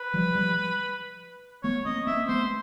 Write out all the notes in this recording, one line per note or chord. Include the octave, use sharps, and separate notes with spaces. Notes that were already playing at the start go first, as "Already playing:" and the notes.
Already playing: B4
F3 G3
F3 G3
A3 B3 C#5
A#3 C4 D#5
A#3 C4 E5
A3 B3 C5